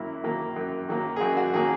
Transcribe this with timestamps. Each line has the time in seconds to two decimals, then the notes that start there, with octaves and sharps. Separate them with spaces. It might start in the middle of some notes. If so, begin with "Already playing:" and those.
Already playing: F#2 D#3 F#3 A#3 E4
0.23 D#3 F#3 A#3
0.56 F#2
0.88 D#3 F#3 A#3
1.16 G#4
1.20 F#2 F#4
1.37 F#4
1.53 D#3 F#3 A#3 G#4